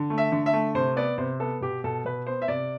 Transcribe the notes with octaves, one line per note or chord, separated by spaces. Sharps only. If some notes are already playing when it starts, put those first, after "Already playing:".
Already playing: D3
A3
E5
D3
E5
A3
C3 C5
B3 D5
C3 C5
B3 A4
B2 G4
B2 A4
B2 B4
B3 C5
E5
C3 D5